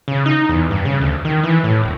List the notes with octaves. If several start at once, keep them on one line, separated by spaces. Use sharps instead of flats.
C#3
D#4
E2
G2
C#3
D2
D#3
E3
A2
D#1